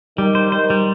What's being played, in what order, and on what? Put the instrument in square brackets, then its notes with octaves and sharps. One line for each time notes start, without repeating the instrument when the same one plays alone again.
[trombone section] D#3 [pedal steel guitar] G3
[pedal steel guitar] C5
[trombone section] D#3 [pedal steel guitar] C5
[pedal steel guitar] G3